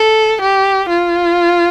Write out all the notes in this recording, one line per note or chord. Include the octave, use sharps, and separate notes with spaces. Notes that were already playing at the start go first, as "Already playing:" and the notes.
Already playing: A4
G4
F4